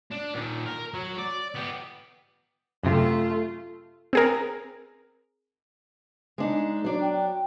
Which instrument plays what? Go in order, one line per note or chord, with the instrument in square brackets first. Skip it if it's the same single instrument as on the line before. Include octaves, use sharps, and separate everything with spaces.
[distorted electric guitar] D4
A#2 D#3
A#4
F#3
D5
B3 G4
[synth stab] F#2 C3 [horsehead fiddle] A3 F4
[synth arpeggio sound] C4 G#4 A#4
[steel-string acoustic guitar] G#3 D4 D#4
F#3 D4 D5
[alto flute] G5